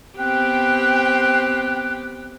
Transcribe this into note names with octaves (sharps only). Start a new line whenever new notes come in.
B3 C4 G4 G5 F#6